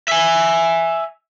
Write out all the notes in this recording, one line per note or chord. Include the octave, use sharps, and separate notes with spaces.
E5 G#5